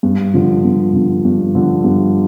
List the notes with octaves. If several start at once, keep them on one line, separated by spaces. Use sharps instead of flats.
G2
D3 F3
G2
D3 F3
G2
D3 F3
G2